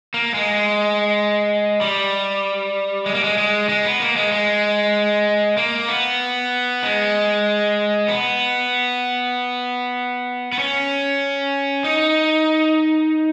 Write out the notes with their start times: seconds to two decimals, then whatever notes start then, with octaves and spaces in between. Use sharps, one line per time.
0.14 A#3
0.34 G#3
1.81 G3
3.06 G#3
3.15 A#3
3.24 G#3
3.38 G#3
3.69 G#3
3.85 B3
4.01 A#3
4.16 G#3
4.32 G#3
5.57 A#3
5.88 B3
6.83 G#3
8.08 B3
10.52 B3
10.59 C#4
11.84 D#4